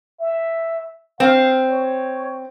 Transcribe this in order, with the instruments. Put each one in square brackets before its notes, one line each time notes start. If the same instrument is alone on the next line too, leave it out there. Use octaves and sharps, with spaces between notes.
[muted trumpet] E5
[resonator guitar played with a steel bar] C4 [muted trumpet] F5
[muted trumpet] C#5